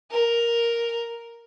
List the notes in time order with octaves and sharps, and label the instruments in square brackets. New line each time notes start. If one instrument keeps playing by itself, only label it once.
[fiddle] A#4